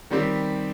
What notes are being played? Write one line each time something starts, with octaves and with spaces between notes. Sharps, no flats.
D#3 G3 C4 G4